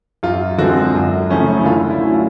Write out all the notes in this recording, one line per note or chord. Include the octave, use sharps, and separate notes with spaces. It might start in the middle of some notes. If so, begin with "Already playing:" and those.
F#2 F4
D3 F3 G#3 C4 F#4
F#2
C#3 F3 A3 C#4
E4
D3 F4
E4
F#3 A3 C#4
F4